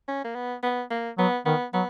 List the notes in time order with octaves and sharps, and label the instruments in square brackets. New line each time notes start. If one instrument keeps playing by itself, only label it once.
[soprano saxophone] C#4
A#3
B3
B3
A#3
[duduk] F#3 [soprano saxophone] B3
[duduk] D#3 [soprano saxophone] B3
[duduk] F#3 [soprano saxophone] B3